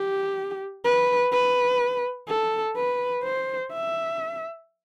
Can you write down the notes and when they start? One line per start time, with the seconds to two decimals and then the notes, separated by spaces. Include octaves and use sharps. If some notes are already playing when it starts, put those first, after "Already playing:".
Already playing: G4
0.84 B4
1.32 B4
2.28 A4
2.76 B4
3.24 C5
3.73 E5